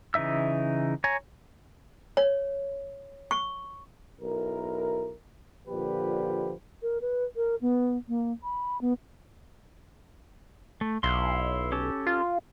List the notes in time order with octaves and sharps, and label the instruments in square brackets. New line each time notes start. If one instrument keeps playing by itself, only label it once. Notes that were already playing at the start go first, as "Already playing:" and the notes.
[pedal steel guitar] C#3 E3 D#4 E5 E6
C#5 G#5 A#5
[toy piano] C#5
C#6
[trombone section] B1 E4 A#4
A#2 D3 F3 G4 B4
[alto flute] A#4
B4
A#4
B3
A#3
B5
B3
[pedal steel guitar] A3
[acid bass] B1 [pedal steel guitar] E4 F5 C6
[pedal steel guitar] C#4 G4 A4
[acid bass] F4